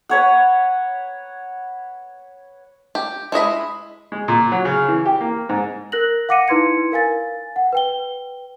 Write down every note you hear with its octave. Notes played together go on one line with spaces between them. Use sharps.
B4 C#5 F#5
G4
G#3 E4 D#5 B5
G#3
A#2
F#3
C#3
E3
G4
A#3
G#2
A#4 F#6 A#6 F#7
F5 F#5 D6 A#6 C#7 D#7
D#4 E4 B4 C6 G#6 C#7
A#4 F5 G#5 A6
F#5
B4 G5 G7